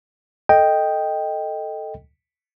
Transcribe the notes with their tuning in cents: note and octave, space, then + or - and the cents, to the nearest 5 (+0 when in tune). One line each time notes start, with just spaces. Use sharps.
A4 +0 D#5 +0 G5 +0